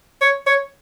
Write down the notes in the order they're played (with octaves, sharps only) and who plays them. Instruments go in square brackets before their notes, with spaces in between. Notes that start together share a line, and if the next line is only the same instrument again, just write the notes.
[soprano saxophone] C#5
C#5